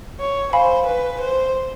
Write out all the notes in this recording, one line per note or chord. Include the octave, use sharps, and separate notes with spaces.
C#5
C5 F5 G#5 B5
B4
C5